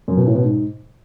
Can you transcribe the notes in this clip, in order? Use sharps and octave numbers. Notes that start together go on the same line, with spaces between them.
F#2
B2
A2
B2
G#2